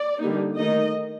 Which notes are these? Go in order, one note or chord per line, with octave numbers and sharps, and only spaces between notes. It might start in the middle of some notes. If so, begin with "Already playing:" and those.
Already playing: D5
D3 G3 A#3 D#4
D#3 A3 D#4 D#5